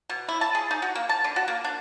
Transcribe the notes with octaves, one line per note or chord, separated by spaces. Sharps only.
B2
E4
A5
G#4
D#4
F#4
A#3
A5
D3
F#4
A#3
D4